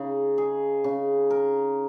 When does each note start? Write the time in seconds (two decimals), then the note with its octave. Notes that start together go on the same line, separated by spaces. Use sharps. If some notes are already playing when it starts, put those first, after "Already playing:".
Already playing: C#3 D#4
0.38 G#4
0.84 C#3
1.30 A#4